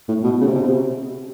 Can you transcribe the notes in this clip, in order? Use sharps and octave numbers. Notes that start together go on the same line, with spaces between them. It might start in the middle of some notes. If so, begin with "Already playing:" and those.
A2
B2
C#3
C3
B2
C3